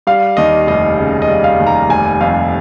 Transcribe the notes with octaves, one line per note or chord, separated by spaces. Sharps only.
G3 F5
D#2 D#5
F1 D#5
C#3
D#5
G3
F5
D#2
A#5
F1 G#5
F2 F5